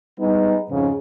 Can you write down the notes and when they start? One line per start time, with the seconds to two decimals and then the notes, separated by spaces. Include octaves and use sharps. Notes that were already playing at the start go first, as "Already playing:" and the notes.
0.19 G3 G#3 B3 D#4
0.70 F2 G#2 C#3